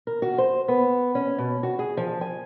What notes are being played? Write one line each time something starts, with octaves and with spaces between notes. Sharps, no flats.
A#4
F#4
C5
B3
C#4
B2
F#4
G#4
F3
G#5